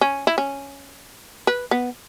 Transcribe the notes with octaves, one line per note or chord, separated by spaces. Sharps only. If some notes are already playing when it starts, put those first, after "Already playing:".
C#4
E4
C#4
B4
B3